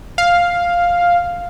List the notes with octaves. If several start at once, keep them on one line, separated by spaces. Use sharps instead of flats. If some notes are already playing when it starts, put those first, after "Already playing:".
F5